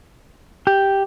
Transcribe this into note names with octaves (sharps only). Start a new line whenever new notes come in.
G4